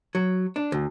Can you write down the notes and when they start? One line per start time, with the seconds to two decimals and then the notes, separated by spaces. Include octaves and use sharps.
0.15 F#3
0.56 D4
0.72 D2